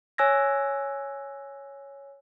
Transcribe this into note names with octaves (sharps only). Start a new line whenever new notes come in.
C#5 G#5 E6 F#6 G#6 A#6